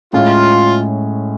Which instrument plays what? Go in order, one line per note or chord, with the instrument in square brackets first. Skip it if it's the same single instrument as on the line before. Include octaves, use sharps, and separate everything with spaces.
[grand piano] A2 G#3 C#4 [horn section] F4